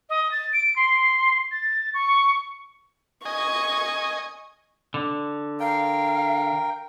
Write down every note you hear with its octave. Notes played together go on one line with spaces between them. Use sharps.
D#5
A6
D7
C6
A6
C#6
D#5 G#5 C#6
D3
A#4 F5 G5